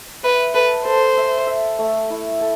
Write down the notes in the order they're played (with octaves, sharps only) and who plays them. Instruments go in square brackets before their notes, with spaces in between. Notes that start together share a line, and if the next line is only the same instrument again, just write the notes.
[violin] B4 [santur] E5
[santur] A4 [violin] B4
[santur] A4 [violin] C5
[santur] E5
E5
A3
E4
A4